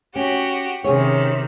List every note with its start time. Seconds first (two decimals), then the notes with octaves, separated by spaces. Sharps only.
0.16 C#4 F#4 G4
0.84 C3 D#3 C#4 G#4 C#5